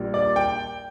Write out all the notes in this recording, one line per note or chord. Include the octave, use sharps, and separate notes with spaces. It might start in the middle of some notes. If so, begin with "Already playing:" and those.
Already playing: A#1 A#2 G3
D5
G5